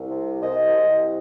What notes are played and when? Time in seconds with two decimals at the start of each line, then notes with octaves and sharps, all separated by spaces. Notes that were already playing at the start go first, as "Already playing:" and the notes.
Already playing: C2
0.09 C3
0.41 C2 C5 D#5
0.75 C2